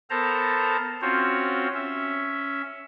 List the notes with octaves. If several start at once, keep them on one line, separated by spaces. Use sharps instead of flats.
B3 A4 A#4 C5 A5 A#5
C4 C#4 F4 F#4 C5 C#5
C#4 E5